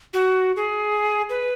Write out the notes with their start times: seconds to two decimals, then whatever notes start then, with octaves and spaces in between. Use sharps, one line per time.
0.14 F#4
0.56 G#4
1.30 B4